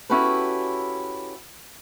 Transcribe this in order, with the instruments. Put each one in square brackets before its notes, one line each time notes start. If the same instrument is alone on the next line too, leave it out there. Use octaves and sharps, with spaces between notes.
[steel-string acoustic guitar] C#4 E4 F#4 G4 A4 B4